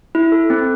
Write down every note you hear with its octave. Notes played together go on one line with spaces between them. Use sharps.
E4
A4
C4